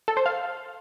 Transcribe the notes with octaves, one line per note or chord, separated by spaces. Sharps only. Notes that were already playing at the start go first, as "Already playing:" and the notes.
A4
C5
F5